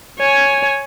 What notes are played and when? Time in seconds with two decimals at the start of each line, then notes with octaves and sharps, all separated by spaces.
0.19 C#5 G#5